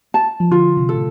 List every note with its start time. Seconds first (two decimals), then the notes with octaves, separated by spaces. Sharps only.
0.14 A5
0.40 F3
0.51 D3 F4
0.77 C3
0.89 A4
0.94 A2